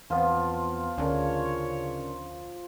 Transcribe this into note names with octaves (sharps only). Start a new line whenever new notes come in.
E2 F3 B3 C4 F4
D2 C#3 C#4 D4 A#4 C#5